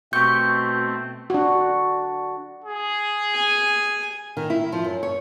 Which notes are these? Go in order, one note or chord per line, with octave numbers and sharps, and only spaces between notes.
B2 A3 C4 G4 C#6 G6
D4 F#4
G#4
G#5
D#3
E4
F3
F#2
C#5